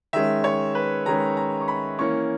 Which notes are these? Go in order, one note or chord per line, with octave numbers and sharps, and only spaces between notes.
D#3 G#3 C#4 E5
C#5
B4
D#3 G#3 C#4 A#5
A#5
C#6
B5
E3 A#3 C#4 C#6